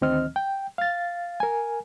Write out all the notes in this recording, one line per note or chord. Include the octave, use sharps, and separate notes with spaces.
D2 D#3 C4 D#5 F6
G5
F5 A6
A#4 G#5